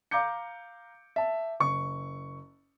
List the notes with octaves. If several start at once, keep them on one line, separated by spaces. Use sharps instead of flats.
F5 A#5 D6 G6 C#7
E5 A5
F#1 C#6